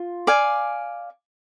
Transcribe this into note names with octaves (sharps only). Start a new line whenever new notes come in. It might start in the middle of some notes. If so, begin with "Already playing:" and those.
Already playing: F4
D5 F5 G#5